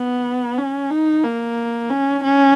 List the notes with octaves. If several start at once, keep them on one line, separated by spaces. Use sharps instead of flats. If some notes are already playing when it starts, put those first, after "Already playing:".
Already playing: B3
C#4
D#4
A#3
C#4
C#4